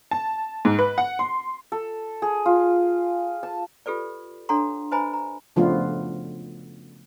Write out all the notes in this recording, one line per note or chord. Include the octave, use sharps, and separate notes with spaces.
A5
G#2
B4
F#5
C6
A4
G#4
F4
A5
F4 G4 A4 B4 D5
D4 A4 C#5 F#5 A#5 C6
B4 C5 D#5 G#5 A#5 B5
A#5
C#3 F3 A3 B3 D4 F4